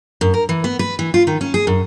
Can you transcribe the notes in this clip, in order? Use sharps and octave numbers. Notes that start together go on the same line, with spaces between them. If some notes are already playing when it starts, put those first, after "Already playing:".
F#2
A#4
E3
B3
B4
E3
F4
D#3
C#4
G#4
F#2